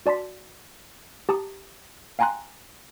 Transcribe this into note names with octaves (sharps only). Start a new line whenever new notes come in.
F#4 D5 A5 C6 B6
G4 A5 A#5 D#6
F5 G5 G#5 A#5 C6 F#6